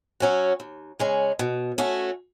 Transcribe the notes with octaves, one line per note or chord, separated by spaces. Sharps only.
F#3 C#4 F#4
D#2
C#3 G#3 C#4
B2
A3 C#4 F#4